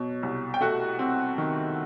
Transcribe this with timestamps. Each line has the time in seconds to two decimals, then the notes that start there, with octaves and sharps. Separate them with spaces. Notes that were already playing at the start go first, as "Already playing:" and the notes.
Already playing: B2 F#3
0.23 C2
0.54 G5
0.61 A3 F#4 F#5
0.99 C4
1.38 D#3